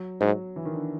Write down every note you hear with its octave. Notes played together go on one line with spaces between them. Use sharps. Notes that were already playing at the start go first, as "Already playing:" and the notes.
Already playing: F#3
G#2 F#3
E3
D#3
D3